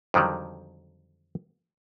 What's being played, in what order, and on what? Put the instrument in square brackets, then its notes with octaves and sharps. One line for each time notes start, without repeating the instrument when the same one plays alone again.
[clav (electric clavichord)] F2 D3 D#3 F#3 G3